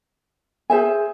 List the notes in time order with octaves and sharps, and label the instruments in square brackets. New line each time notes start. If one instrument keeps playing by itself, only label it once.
[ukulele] G#4 C5 E5 G#5